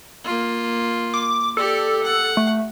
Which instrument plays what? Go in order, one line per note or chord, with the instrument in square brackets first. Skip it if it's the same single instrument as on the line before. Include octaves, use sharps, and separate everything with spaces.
[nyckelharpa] A#3 F4
[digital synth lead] D6
[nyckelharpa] G4 D5 [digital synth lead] A4
[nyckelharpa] F#5
[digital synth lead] A3